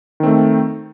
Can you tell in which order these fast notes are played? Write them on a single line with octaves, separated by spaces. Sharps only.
D#3 C4 A3